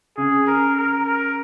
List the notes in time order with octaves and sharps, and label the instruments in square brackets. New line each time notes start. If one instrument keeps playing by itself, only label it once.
[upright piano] C#3 [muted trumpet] G#4
[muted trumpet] A#4
A#4
A#4